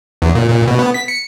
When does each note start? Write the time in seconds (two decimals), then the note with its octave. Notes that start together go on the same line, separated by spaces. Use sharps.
0.22 E2
0.35 A#2
0.48 A#2
0.67 B2
0.79 B3
0.94 B6
1.08 C#7